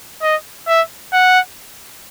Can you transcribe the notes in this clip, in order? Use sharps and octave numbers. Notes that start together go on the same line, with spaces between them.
D#5
E5
F#5